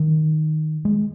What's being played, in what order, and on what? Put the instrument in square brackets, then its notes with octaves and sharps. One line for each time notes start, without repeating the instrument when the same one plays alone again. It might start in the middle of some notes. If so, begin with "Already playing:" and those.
Already playing: [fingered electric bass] D#3
G#3